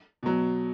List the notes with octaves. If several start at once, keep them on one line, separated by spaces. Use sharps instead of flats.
B2 F#3